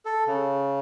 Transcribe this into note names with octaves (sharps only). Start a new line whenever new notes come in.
A4
C#3